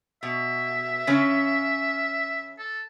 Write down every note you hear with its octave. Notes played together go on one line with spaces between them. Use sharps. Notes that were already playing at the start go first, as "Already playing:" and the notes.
B2 E5
C#3 C#4
A4